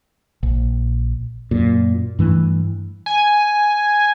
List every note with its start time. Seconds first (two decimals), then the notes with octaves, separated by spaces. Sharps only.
0.43 A#1
1.51 F#2 A#2
2.19 G2 E3 A3
3.06 G#5